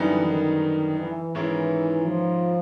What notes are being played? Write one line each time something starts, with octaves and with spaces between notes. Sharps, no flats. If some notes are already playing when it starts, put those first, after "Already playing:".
Already playing: F#2 D3 E3 G3 B3 D#4
D#3
E3
G#2 D#3 E3 G#3 C#4 E4
F3